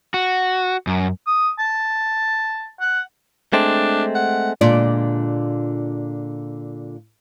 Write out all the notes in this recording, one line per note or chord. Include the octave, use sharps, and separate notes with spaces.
F#4
F#2
D#6
A5
F#5
G#3 A3 C4 D4
F#5
A#2 D3 G#3 D4 F4 D5